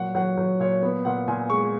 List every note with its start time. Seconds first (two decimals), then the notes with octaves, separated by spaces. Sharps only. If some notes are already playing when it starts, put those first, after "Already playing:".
Already playing: A#2 F#3 F#5
0.15 F#3 F#5
0.37 F#3
0.60 A#2 C#5
0.82 B3
1.05 A#2 F#5
1.28 A#2 G#5
1.50 G#3 C#6